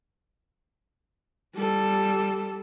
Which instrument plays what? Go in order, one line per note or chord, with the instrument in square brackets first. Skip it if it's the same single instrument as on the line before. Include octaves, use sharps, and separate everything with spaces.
[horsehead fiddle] G3 A4